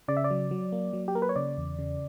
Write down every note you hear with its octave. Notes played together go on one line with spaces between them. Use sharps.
C#3 D5
E5
D5
F#3
F#3
A#3
F#3
G4
A#3 A#4
B4
C#5
C#3 D5
E2
C#3